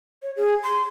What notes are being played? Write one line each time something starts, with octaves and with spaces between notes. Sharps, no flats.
C#5
G#4
C6